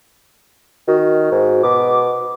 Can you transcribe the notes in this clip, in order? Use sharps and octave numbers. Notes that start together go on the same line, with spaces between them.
D#3 F#4
G#2
B2 D6